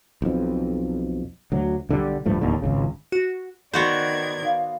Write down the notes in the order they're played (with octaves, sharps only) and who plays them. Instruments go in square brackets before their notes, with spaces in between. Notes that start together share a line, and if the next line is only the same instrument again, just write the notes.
[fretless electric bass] B1 F2
D2 F#3
B1 D3 F#3 G3
D1 G2 F3 A3
D1 D#2 D3
G#1 C#2 C#3
[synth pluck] F#4
[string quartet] D#3 D5 G#6 [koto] B3 F#4 C5
[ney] F5